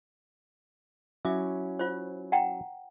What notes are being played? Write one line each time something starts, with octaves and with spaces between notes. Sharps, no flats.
F#3 C#4 E4 E5 D6
F4 C5
F#5 G5 A#5